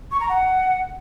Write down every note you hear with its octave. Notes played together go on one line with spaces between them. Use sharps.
C#6
A#5
F#5